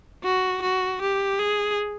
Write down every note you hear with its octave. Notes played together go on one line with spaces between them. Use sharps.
F#4
F#4
G4
G#4